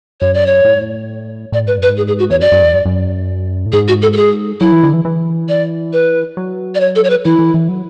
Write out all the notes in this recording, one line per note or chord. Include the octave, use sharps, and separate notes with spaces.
F#2 C#5
D5
C#5
A2
G#2
A2
A2 D5
G#2 B4
F#2 B4
G#2
G#4
G#4
F#4
E2 C#5
F#2 D5
F#2
E2
F#2
F#2
A2
G#2 G#4
F#4
A4
A4
G#4
F#3 E4
E3
D3
E3
E3
D5
B4
F#3
D5
C#5
A4
C#5
B4
E3 E4
E3
E3
F#3